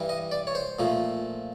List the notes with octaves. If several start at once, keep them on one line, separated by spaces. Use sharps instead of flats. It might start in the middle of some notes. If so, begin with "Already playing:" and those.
Already playing: G2 E3 G3
D#5
D5
C#5
C5
A#2 F3 A3